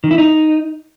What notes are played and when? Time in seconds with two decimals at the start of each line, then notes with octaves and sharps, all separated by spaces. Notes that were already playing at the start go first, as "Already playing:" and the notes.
0.04 D#3
0.11 E4
0.18 D#4